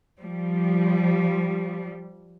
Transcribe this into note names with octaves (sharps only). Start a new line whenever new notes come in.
F3 G3